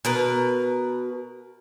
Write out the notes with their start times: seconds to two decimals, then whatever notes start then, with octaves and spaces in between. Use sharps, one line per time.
0.05 B2 A#4 B4